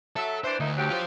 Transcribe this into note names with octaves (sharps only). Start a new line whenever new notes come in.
F#3 A4 E5
E3 D4 C5
D2 A#3 D#4 E4
G2 F#3 G4
F4 C5